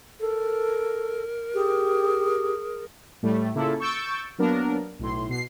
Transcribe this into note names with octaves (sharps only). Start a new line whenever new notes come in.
A4 A#4
G4 G#4
A2 G3 A3
C#3 A#3 E4 F4 A4
C#6 E6 G6 A6 C#7 D7
F#3 A#3 B3 D4 A#4
B1 A2 C6
B2 C7